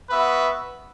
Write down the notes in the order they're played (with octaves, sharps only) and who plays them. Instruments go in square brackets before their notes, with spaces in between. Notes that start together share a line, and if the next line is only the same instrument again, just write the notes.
[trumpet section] B3 F#4 B4 E5